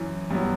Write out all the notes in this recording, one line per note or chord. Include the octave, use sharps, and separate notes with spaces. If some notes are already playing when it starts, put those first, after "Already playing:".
Already playing: F#2 E3
G2 F#3 B3